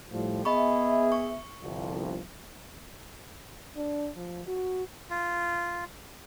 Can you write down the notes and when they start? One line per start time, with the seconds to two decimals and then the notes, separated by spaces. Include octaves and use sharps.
0.12 A2 F3 G3
0.45 B3 G#4 D#5 E5 B5 C#6
1.12 C#6
1.61 G1 C2 F3
3.77 D4
4.16 F3
4.48 F#4
5.10 F4